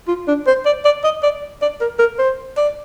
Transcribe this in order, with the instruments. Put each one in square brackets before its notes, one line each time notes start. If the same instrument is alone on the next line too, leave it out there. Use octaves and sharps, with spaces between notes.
[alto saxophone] F4
D4
C5
D5
D5
D#5
D5
D5
A#4
A#4
C5
D5